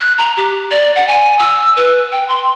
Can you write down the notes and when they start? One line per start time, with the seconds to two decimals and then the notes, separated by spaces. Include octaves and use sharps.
0.01 F#6
0.18 A#5
0.37 G4
0.71 D5
0.96 F#5
1.08 G#5
1.39 E6
1.76 B4
2.12 G5
2.28 C6